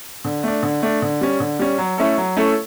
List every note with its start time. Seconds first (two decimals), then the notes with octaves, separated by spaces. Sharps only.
0.25 D3
0.43 A3 D4
0.63 D3
0.82 A3 D4
1.02 D3
1.21 G3 C#4
1.40 D3
1.59 G3 C#4
1.78 F#3
1.98 A3 C#4 E4 A4
2.18 F#3
2.37 A3 C#4 E4 A4